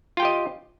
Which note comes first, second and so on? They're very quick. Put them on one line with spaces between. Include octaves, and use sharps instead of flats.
F4 G5 G4 D#5